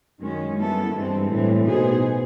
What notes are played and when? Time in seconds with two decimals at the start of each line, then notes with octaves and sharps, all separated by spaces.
0.20 F#2 D#3 G#3 C#4
0.57 G3 B3 E4 A4
0.93 G2 E3 G#3 C4
1.29 A2 E3 G3 C4
1.65 B2 B3 D#4 G#4 C5